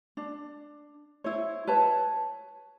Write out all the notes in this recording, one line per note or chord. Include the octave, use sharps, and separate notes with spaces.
D4
E4 C5 C#5
B4 C#5 A5